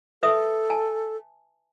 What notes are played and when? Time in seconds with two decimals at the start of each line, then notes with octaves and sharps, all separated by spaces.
0.23 A4 B4 E5 D#6
0.70 G#5 A5